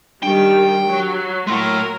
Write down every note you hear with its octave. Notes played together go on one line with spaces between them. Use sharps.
D#3 G3 D4 G4 G5
F#3
F#3 A3 A#3 E4 A#4 C6